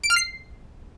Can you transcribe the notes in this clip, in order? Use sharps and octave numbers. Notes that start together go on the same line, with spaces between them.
D7
F6
C7